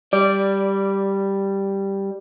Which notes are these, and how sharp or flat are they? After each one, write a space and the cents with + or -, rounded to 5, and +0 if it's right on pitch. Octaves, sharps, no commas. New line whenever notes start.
G3 +0 D5 -10